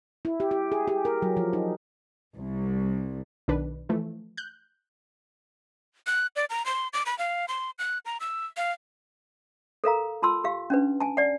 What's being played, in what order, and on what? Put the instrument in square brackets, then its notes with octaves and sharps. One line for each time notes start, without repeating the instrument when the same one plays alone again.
[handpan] E4
G4
G4
G#4
G4
A#4
F#3
F3
D#4
[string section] C2
[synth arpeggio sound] B1 D#3 D4 B4
E3 F3 A3
F#6 G6
[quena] F#6
D5
A#5
C6
D6
B5
F5
C6
F#6
A#5
E6
F5
[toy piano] A4 A#4 F5 A#5
F4 A5 C6 E6
G4 F5
C#4 D4 B4
G#5 A5
D5 F#5